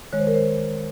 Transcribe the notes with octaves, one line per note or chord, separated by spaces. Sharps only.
D#3 G#3 C#5
C5
A#4
C5